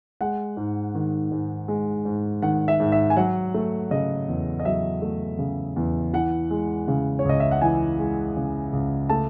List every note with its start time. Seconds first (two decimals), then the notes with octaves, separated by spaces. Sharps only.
0.21 G#3 F#5
0.57 G#2
0.94 D#3
1.31 G#2
1.68 G#3
2.05 G#2
2.42 D#3 F#5
2.68 E5
2.80 G#2
2.92 E5
3.10 G#5
3.17 F#3 F#5
3.54 A3
3.91 C#3 D#5
4.28 E2
4.60 D#5
4.65 F#3 E5
5.02 A3
5.39 C#3
5.76 E2
6.13 E3 F#5
6.51 G#3
6.88 C#3
7.19 C#5
7.25 C#2 D#5
7.40 E5
7.51 F#5
7.62 E3 G#5
7.99 G#3
8.37 C#3
8.73 C#2
9.09 A3 A5